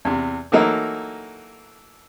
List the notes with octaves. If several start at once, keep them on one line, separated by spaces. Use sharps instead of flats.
E2 C3
E3 F#3 A3 A#3 D#4 E4